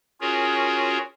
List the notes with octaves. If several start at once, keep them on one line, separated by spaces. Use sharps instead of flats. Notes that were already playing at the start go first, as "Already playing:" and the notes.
C#4 F4 F#4 G#4 A#4 C#5